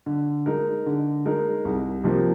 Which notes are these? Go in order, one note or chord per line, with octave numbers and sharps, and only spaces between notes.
D3
G#3 D#4 A#4
D3
G#3 D#4 A#4
C2
C3 F3 A#3 D#4